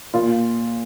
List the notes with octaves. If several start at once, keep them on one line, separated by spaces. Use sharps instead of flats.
A#2 F4